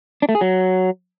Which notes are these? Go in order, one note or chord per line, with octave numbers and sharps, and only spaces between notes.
D4
A3
G#4
F#3